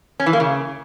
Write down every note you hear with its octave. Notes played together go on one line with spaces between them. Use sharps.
C#4
E3
A#3
C#3